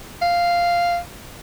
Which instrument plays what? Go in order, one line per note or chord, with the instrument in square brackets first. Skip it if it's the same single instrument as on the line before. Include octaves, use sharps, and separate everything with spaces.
[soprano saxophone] F5